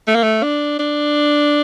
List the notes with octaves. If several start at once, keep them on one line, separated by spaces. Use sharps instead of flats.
A3
A#3
A3
D4
D4